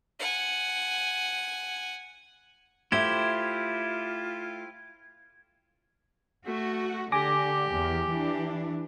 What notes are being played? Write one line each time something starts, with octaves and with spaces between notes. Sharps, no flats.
F#5 G#5
A3 E4 F4 G4 C5 E5 G#6
A3 F#4
D3 G4 G#5 D6 A#6
E2
E3 D4